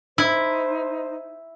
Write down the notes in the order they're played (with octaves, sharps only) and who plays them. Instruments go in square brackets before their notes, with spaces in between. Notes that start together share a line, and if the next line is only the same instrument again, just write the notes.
[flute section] D#4 C5 [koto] E4